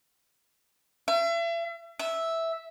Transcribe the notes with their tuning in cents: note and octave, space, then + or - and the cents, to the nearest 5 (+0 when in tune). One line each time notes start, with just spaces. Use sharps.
E5 +40
E5 -5